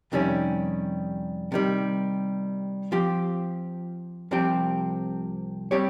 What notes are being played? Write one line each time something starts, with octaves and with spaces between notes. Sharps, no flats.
F2 C3 D#3 G3 C#4
C3 D#3 G3
F3 C4 G4
C2 C3 F3 C4 G4
G3 C4 G4 C#5